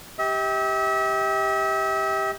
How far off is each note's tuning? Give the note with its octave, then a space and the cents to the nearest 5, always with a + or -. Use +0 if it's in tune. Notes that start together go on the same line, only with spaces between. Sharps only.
G4 +0 E5 -40